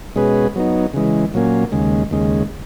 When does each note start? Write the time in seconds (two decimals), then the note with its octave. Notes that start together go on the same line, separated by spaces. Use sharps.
0.16 B2 G#3 C#4 G#4 B4
0.56 F#3 B3 D#4
0.94 C#3 E3 G#3
1.34 A#2 F#3 A#3 C#4
1.72 D#2 C#3 G#3
2.11 D#2 C#3 G#3